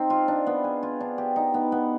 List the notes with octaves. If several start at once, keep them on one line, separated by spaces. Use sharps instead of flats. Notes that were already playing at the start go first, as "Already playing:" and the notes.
Already playing: C4 D#4
F4
D4
B3
G#4
F4
D4
G4
D#4
B3
B3